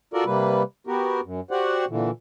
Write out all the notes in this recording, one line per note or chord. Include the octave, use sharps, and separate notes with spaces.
F4 F#4 A4 A#4 D5
C3 G3 A#3 B4
B3 F#4 G4 A#4
F#2
F#4 G4 C5 D5 F#5
A#2 D3 E3